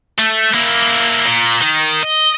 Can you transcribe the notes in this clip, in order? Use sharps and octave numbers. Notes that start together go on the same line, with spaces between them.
A3
A#3 E4
A#2
D#3
D#5